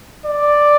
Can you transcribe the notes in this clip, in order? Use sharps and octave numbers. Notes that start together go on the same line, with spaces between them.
D5